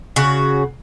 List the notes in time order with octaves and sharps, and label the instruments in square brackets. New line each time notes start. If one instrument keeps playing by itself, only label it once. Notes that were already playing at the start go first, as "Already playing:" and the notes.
[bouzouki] C#3 F#4